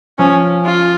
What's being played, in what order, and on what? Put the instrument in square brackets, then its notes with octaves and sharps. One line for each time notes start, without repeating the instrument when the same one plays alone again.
[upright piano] F3 [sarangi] C#4
[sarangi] F4